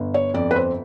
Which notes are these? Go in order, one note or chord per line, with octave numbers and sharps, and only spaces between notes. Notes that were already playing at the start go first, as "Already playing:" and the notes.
Already playing: G1
C#5
F2 D5
B4
C5